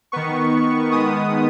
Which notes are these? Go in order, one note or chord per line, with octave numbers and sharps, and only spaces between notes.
D#3 B3 C#6
D#3 G#3 B3 D#6